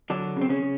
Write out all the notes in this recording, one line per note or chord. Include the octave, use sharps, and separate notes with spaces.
D3 F#3 D4
C#3
C4
C#3 C#4
C#3